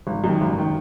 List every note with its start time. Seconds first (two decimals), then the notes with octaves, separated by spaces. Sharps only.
0.07 G#1
0.24 F#2 D#3
0.41 G#1
0.58 D#3